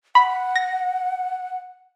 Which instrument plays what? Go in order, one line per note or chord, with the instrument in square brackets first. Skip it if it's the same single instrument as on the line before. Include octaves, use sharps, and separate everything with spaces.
[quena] F#5 [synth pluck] B5
[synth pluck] A#6